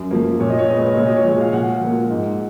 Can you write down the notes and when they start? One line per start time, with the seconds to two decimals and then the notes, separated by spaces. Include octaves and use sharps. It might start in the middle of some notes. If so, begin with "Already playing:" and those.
Already playing: F#2
0.11 F3 A#3
0.39 A#2 C#5
0.50 D#5
0.59 C#5
0.69 G#3 B3 D#5
0.78 C#5
0.88 D#5
0.96 A#2 C#5
1.06 D#5
1.17 C#5
1.25 F3 G#3
1.41 F5
1.53 A#2 F#5
1.81 F3 A#3
2.10 G#2